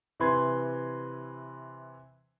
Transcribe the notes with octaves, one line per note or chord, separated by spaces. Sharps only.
C3 E3 B4 C6 G#6